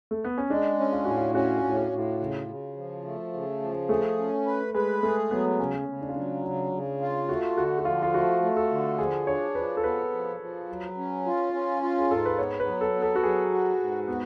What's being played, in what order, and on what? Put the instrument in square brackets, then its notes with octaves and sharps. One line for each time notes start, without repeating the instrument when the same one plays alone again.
[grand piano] A3
B3
C#4
[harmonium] G#3 [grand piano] D4
[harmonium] C#4
[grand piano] F4
[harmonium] A2 [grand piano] F#4
[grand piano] F4
[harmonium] C#4 [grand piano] F#4
[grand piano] F4
[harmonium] A2
[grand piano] F4
F#4
[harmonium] A2
[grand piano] F4
[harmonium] C#3
C#3
F3
A3
C#3
F3
[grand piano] A3 [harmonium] G#4
[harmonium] C#4
B4
[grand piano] G#3 [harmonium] B4
[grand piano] A3 [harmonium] G#4
[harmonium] F#3 [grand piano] B3
[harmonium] C#3 [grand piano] C#4
[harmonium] C#3
[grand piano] D4
F4
[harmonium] F#3 [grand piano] D4
[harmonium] C#3 [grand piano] F4
[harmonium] C#3
F4
[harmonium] A3 [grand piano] F#4
[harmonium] D3 [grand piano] F#4
[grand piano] F#4
[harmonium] F3 [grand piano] F4
[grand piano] F4
[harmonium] A3 [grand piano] F#4
[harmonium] A3
[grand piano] A4
[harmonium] D3
[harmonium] F3 [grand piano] G#4
[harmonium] D4 [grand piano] C#5
[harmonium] F3 [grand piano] B4
[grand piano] A4
[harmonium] B3 [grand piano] B4
[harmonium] F3
F3
F#3
C#4
F4
C#4
F4
[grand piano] G#4
[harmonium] G#2 [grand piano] A4
[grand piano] B4
[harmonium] B3 [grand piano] C#5
[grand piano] B4
[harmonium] F#3
[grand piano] A4
[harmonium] B3
[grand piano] A4
F#4
[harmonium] F#3 [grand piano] G#4
[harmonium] F#4
G#2
[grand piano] B3 [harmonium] F#4